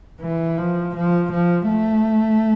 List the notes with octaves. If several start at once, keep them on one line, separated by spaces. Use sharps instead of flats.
E3
F3
F3
F3
A3